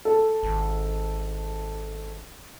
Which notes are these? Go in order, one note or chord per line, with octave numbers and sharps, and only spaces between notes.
A4
G#1